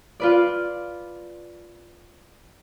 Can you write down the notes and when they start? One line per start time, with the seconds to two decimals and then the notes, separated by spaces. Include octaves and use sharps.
0.20 F4 B4 D5